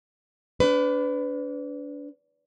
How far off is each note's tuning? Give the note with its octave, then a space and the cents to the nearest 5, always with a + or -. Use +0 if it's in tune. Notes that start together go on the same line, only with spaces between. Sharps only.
D4 -30 B4 +25